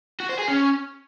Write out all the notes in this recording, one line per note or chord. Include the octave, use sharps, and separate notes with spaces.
F#4
C5
G#4
C#4